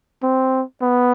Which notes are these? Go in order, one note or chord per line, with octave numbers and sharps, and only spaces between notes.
C4
B3